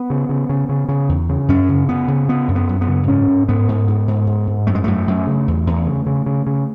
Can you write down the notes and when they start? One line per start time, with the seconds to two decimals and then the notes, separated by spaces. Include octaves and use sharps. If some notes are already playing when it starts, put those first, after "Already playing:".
Already playing: B3
0.10 C#3
0.29 C#3
0.49 C#3
0.69 C#3
0.89 C#3
1.09 E2
1.29 C#3
1.48 F#2 C#4
1.69 C#3
1.88 C#3 B3
2.08 C#3
2.29 C#3 B3
2.48 F#2
2.55 B3
2.69 F#2
2.81 B3
2.88 C#3
3.08 G#2 C#4
3.27 G#2
3.48 G#2 B3
3.68 G#2
3.88 G#2
4.08 G#2
4.27 G#2
4.47 G#2
4.67 F#2 A3
4.75 G#3
4.84 F#2 A3
5.07 F#2
5.27 C#3
5.48 E2
5.67 E2
5.86 C#3
6.06 C#3
6.26 C#3
6.47 C#3